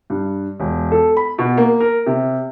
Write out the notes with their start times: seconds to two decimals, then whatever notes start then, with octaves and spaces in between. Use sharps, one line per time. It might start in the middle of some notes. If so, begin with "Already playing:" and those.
0.10 G2
0.60 E1
0.92 A4
1.17 B5
1.39 B2
1.58 A#3
1.81 A#4
2.06 C3